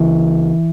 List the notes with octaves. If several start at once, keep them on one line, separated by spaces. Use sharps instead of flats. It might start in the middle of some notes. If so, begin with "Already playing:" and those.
Already playing: C#2 C#3 E3